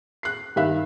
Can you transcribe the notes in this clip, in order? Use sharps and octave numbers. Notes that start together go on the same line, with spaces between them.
F#6 C7
G2 D#3 E5 F5 F#6